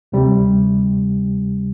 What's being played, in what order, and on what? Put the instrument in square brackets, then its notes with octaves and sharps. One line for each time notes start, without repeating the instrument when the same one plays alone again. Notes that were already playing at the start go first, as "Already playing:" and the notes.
[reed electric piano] D2 C3 G3